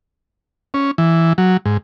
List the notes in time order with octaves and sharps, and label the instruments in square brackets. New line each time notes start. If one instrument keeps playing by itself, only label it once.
[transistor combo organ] C#4
E3
F#3
G#2